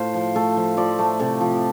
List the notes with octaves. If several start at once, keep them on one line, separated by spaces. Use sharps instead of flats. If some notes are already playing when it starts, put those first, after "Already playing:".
Already playing: A2 A3 F4 A4 C5
F3
A3 A4
F3
F3 D5
A3
C3 A4
F3